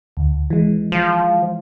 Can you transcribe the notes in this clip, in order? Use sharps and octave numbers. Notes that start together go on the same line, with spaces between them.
D2
E3 G#3
F3